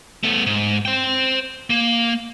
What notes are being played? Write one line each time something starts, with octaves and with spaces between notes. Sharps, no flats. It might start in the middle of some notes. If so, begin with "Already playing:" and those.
A3 B3
G#2
C5 G5
A#3